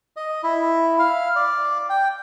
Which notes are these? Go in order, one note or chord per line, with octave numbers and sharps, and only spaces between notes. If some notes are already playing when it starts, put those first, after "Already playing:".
D#5
E4
F5
D5
G5